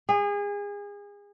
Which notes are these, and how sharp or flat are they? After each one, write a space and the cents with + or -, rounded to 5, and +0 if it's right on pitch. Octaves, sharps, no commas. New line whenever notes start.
G#4 -30